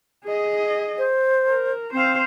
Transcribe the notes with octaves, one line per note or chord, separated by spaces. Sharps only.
G#4 D#5
C5
A#4
C4 C5 F5